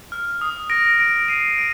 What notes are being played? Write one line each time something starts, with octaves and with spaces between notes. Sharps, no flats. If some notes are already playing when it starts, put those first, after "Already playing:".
F6
D#6
A#6 D7
A#6 D7
C7 D#7
D7